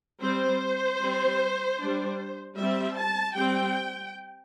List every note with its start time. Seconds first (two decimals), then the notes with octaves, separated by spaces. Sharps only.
0.21 G3 C4 C5
1.00 G3 C4
1.80 G3 D4
2.58 G3 C4 E5
2.97 A5
3.36 G3 C4 G5